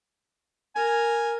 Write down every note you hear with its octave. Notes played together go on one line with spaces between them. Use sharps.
A#4 G#5